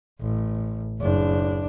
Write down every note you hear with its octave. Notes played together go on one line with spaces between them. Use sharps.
A1
F#1 D4